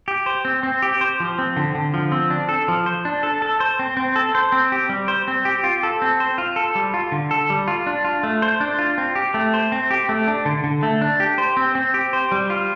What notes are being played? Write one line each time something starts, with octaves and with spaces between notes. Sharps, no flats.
G4
C5
C4
C4
G4
C5
F3
C4
D3
D3
F3
C4
D4
A4
F3
C5
D4
A4
A4
C5
C4
C4
A4
C5
C4
G4
G3
C5
C4
G4
F4
A4
C4
C5
F4
A4
G3
F4
D3
A4
G3
F4
D4
F4
A3
C5
D4
F4
C4
G4
A3
C5
C4
G4
A3
D4
D3
D3
A3
D4
G4
C5
C4
C4
G4
C5
G3
F4